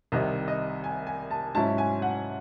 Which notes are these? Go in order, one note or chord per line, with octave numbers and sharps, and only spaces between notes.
C2 C3 D#3 D#5
D#5
G#5
G#5
A5
G#2 F#3 C#4 E4 A5
G#5
F#5